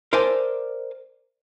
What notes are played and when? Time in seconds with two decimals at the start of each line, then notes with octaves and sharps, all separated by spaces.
0.13 A#4 C5 D5 E5 G#5 A5